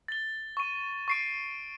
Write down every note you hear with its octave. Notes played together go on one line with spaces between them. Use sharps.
A6 G7
C#6 D#7
C#6 C7 D7